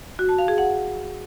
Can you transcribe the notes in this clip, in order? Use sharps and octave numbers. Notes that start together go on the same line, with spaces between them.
F#4
A5
F5
G#4
F#5